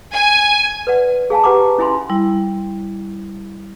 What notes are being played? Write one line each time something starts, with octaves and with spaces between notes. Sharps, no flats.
G#5
B4 D5 F#5
G#4 F5 G#5 A5
G4 B4 F#5 A#5 D6
C#4 E4 E5 G#5 B5 C6
G3 E4